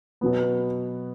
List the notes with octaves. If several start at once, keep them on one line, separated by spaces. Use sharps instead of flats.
B2 F#3 B3